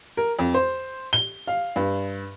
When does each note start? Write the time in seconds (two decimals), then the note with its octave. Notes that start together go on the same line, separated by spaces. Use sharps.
0.17 A#4
0.39 F2
0.54 C5
1.13 G7
1.47 F5
1.76 G2